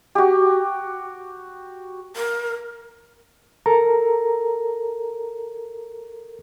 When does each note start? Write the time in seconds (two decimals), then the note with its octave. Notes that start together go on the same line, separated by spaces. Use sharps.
0.15 F#4 G4
2.16 A#4
3.66 A4 A#4 A#5